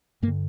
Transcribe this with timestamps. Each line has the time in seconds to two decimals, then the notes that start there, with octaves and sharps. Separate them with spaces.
0.23 G2 A#3
0.28 D3